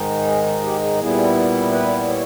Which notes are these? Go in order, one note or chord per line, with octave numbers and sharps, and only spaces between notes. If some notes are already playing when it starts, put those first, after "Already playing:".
Already playing: G#2 D#3 G#3 D#4
G#4
G4
G#4
A#2 G3 B3 E4 G#4
B4
C#5